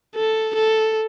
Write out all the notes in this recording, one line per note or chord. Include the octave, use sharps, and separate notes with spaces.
A4
A4